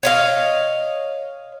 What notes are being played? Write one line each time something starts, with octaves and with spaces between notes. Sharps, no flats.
C#5 D#5 F5